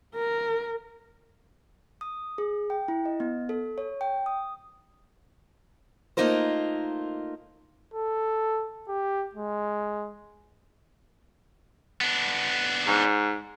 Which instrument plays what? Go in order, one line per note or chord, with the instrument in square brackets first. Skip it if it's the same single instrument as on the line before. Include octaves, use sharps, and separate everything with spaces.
[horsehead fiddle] A#4
[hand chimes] D#6
G#4
G5
E4
D#5
B3
A4
C#5
G5
D#6
[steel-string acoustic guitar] A3 A#3 D#4 F4 A#4 C5
[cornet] A4
G4
G#3
[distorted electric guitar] B3 D4
[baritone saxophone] G#2